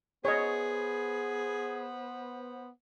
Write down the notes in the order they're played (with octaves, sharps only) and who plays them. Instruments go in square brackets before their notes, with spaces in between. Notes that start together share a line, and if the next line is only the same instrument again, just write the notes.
[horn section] B3 C5 [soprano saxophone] G#4 [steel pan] C#5 D#5